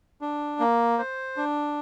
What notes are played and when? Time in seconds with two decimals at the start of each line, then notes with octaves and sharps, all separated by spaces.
0.21 D4
0.59 A#3
0.98 C5
1.37 D4